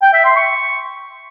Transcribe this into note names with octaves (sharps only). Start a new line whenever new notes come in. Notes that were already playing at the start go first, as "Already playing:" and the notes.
G5
E5
C6
C#6